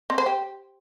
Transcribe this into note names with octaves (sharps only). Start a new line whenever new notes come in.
C4
C5
G4